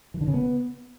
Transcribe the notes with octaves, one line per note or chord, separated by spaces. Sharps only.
E3
D3
C#3
B3